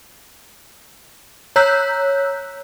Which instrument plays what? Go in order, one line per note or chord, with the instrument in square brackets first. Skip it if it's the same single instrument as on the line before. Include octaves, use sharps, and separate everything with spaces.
[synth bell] C#5 A#5 E6 F#6 G6 B6